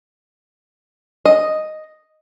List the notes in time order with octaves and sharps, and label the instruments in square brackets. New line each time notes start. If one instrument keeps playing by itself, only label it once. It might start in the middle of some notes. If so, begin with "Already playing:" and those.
[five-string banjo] D#5